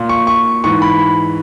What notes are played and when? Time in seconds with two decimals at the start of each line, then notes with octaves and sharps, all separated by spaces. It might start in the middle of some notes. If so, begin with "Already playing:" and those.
Already playing: A#2
0.09 C#6
0.27 C#6
0.64 G#2 E3 C#6
0.82 B5